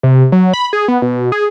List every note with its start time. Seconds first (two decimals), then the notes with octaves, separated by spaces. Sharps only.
0.03 C3
0.32 F#3
0.54 B5
0.73 G#4
0.88 B3
1.02 B2
1.32 G#4